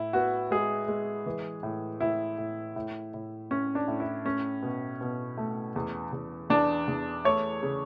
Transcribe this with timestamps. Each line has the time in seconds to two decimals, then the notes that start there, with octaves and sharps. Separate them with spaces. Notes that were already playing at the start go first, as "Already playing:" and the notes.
Already playing: A2 E4
0.13 B3 F#4
0.51 G#3 G#4
0.88 G#3
1.26 E3
1.63 A2
2.00 A2 E4
2.38 A2
2.76 A2
3.14 A2
3.51 A2 C#4
3.75 D4
3.88 A2
4.00 E4
4.25 A3 C#4
4.63 B2
5.01 B2
5.38 A3
5.76 E2
6.13 E2
6.50 E2 D4
6.88 E2
7.25 A3 C#5
7.63 C#3